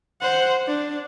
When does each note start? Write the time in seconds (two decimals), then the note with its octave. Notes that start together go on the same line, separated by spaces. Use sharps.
0.22 C5 F#5
0.67 D4